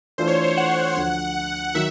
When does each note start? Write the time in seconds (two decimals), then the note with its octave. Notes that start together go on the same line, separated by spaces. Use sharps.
0.18 E3 A3 D4 F4 A4 C5
0.27 C#5
0.44 C5
0.48 C#5
0.57 F#5
0.96 D2 D3 F3
1.75 D#3 F#3 E5